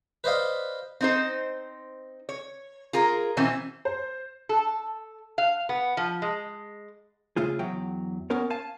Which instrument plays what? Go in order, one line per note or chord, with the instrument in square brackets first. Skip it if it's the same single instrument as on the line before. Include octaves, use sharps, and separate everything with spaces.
[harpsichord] B4 C5 D5 D#5 F5
[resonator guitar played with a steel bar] C4 D#4 C5
C#5
F4 G#4 A#4
B2 E3 C4 C#4
[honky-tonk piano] C5
[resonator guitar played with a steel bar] A4
F5
B3
F3
G#3
[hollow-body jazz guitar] C#3 A3 F4 G#4
E2 F#3 G5
B3 C#4 A#4 C#5
F5 G#5 A5